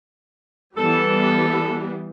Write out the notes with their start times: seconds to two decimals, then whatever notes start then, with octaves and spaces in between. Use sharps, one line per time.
0.78 E3 G3 B3 A4